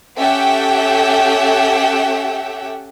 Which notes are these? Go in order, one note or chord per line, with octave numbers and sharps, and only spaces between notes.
C#4 G4 A4 E5 F#5 G5